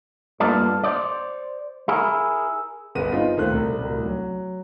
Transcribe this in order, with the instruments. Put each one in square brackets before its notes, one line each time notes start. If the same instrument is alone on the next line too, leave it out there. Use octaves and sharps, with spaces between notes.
[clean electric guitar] G2 A#3 B3 F4 A4 D5
C5 D5
E4 G#4 A#4
[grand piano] G1 G#4 B4 F#5 D#7
C4 D#4 F4
D#2 A3 C5 F#6
C2
D1 C2
F#3